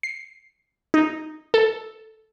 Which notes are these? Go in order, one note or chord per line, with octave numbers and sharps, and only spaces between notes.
C7
D#4
A4